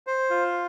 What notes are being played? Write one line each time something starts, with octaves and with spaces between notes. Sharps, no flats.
C5
F4